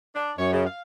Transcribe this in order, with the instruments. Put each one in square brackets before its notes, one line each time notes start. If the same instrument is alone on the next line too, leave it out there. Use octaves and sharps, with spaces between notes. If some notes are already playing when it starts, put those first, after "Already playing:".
[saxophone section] D4
[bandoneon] F#2 [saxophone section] C#5
[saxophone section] C#3
F5